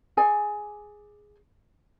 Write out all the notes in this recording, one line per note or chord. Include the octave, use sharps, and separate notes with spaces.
G#4 D5 G#5